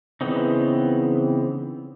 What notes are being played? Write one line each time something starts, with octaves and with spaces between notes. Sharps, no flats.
C#3 E3 B3 C4 D#4